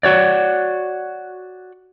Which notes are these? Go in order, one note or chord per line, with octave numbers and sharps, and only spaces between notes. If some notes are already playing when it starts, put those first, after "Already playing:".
F#4 C#5 D5